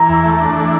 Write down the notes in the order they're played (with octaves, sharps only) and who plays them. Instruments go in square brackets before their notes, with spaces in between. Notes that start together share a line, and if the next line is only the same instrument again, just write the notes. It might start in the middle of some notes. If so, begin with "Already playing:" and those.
Already playing: [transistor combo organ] E3 [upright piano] A#5
[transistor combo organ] E2
A3
D4
E3